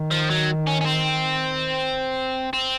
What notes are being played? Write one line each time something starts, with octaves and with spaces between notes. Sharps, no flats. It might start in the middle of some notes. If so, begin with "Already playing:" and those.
Already playing: D#3
F3
F#3
C#4
C#4
C4
C4